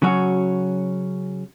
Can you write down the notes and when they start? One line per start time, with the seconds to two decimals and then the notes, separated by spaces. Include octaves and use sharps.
0.02 C#3 F#3 C#4 F#4